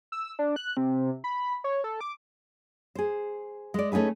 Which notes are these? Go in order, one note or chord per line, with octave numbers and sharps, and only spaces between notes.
E6
D4
F#6
C3
B5
C#5
A4
D6
G#4 C5
G#3 D5
A3 C#4 D#4 G#4 B4